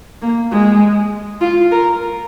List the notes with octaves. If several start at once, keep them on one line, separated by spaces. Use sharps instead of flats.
A#3
G#3
F4
A#4